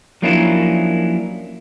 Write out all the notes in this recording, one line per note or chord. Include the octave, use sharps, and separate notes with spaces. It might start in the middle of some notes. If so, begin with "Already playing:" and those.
F3 F#3 A#3 C#4 D4 E4